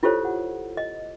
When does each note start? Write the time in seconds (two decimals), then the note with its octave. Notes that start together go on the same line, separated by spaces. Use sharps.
0.03 E4 F4 G4 A4 C5 C#5
0.25 F#5
0.77 D#5